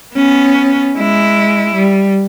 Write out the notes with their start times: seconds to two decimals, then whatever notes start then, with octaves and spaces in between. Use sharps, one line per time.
0.15 B3 C#4
0.98 G#3 E4
1.75 G3